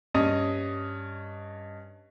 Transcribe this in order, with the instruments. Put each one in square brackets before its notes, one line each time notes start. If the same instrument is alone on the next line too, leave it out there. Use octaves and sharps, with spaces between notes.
[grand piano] G2 C#4 D#5 D#6